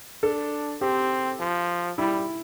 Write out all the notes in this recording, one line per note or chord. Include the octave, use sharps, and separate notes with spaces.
D4 A4
C4 G4
F3
G3 E4